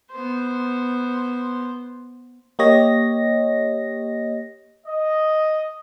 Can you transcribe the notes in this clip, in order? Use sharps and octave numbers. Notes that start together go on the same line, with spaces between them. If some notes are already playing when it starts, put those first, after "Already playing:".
B3 C5
A#3 G4 C#5 D#5 A#6
D#5